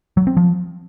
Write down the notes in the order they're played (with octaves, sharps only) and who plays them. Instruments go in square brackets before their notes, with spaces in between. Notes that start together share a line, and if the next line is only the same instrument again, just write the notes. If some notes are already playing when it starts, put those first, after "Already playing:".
[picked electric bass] F#3
C4
F3